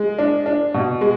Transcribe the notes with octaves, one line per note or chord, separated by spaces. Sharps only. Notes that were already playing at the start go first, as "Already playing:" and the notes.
Already playing: G#3
D4
D4
B2
G#3